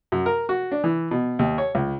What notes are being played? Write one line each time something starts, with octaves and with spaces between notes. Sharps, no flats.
F#2
A#4
F#4
D4
E3
B2
D#2
C#5
C#2